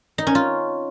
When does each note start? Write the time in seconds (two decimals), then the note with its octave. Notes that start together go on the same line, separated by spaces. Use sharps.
0.18 D#4
0.27 C#4
0.35 F4